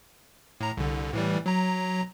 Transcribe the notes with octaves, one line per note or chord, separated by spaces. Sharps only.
A2 A#5
C2 D3
A2 E3 G3
F#3 A#5